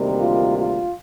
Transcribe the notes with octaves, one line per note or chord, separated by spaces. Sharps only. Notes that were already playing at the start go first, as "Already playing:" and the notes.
Already playing: D2 C3 D#3 G3 A#3
F4
F4